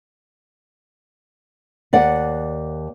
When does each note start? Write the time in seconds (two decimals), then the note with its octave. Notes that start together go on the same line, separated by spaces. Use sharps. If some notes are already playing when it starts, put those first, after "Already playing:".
1.93 D#2 D5 F#5